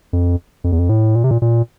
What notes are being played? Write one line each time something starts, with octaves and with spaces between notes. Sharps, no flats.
F2
F2
E2
F2
A2
A#2
C3
A#2
A#2